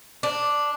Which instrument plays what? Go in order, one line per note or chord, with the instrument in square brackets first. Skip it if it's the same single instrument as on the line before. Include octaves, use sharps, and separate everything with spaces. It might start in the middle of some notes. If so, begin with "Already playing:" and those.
[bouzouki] D4